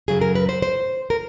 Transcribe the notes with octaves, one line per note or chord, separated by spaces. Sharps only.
F#2 C#3 F#3 G#4
A#4
B4
C5
C5
A#4